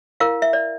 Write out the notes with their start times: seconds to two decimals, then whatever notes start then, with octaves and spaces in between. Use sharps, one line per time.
0.20 E4 A#4 F5
0.42 E5
0.53 D5